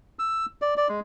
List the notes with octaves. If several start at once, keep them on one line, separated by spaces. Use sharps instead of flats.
E6
D5
D5
G#3